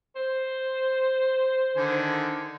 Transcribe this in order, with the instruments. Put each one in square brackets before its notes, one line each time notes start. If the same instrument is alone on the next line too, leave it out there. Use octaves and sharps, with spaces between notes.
[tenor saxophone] C5
[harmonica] D3 D#3 G#5